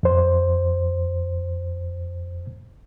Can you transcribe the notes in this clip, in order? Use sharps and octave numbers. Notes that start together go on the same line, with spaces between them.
F2 C5